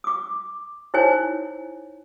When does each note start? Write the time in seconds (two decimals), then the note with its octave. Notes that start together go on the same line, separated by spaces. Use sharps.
0.04 D6 D#6
0.94 D#4 E4 C5 C#5 G#5